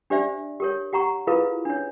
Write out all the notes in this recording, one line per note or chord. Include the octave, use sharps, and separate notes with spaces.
D4 G4 C5 D5 E5
G4 A#4 C#5
G4 F#5 A#5 C#6
E4 F4 G#4 A#4 B4 F5
D4 C#5